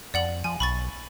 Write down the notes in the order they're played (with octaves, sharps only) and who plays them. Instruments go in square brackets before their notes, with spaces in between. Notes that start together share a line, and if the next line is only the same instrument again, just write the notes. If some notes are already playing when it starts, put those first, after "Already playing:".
[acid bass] F2 [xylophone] D5 F#5 F#7
[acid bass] F3 [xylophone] G#5
[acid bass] B1 [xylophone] B5 C#6 A6